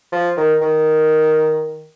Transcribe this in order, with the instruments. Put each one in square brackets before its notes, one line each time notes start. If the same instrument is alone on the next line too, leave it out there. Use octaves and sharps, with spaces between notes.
[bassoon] F3
D#3
D#3